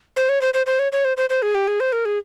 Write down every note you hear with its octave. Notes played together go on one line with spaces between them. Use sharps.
C5
C#5
C5
C5
C5
C#5
C#5
C5
C5
C5
G#4
G4
G#4
C5
A#4
G#4